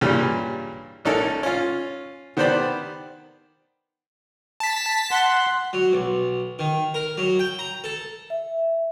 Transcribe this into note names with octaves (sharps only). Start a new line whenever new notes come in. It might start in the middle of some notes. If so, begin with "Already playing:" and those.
G2 A#2 C#3 E3 G3
A#1 C#4 D#4 A4 A#4
C#4 F4
D#3 B3 G4 C5 D5 B5
A5 B6
F#5 C6
F#3
B1
D#3
A#4
F#3
G5
A#5
A4
E5